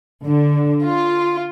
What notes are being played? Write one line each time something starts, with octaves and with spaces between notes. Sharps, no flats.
D3
F4